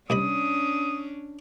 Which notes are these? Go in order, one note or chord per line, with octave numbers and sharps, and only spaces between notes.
C2 C#4 D4 D#5 B5 D#6